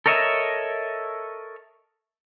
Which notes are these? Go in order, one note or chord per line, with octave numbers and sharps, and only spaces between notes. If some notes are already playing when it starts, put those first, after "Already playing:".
A4 A#4 C#5 D#5 E5